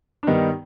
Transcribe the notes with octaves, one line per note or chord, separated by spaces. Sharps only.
D4
G2 D#3 G3 B3 D#4